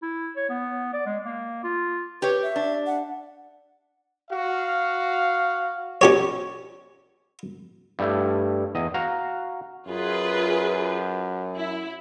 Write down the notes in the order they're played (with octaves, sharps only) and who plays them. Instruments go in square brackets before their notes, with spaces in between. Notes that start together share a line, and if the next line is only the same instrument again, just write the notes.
[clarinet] E4
C#5
B3
D5
G#3
A#3
F4
[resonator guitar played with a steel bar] G4 C#5 [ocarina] B4
[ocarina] E5
[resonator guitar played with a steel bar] D4
[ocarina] F#5
[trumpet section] F#4 F5
[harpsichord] C#4 G4 C#5
[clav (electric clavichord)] G2 G3 A3 E4
E2 D#5
F#4 F5 A#5
[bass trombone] F#2 [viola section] F4 G#4 B4
[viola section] E4